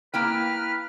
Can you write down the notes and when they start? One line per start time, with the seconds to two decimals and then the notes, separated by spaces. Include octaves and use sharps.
0.14 A#3 E4 B4 G5 F6